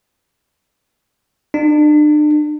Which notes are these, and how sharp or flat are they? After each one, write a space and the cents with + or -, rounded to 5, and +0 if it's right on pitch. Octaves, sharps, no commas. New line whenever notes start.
D4 +40